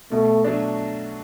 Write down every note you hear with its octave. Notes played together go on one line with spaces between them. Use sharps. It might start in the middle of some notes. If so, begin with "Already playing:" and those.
B2 A3
F#3 A3 D4